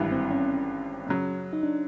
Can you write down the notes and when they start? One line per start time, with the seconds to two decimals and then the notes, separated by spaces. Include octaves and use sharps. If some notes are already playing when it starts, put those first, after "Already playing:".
Already playing: G#1 G2 E3
0.12 C4
0.31 C#4
1.07 F#2 C#3 F#3
1.53 D#4
1.63 D4